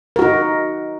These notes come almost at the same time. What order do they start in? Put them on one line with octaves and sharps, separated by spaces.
A#4 F#4 D#4